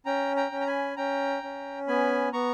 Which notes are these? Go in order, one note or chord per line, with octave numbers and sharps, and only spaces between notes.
C#4 G5 A#5
G5 A#5
C#4
A#5
G#5 B5
C#4 G5 A#5
C#4
B3 G#5 B5
B3 A#5 C#6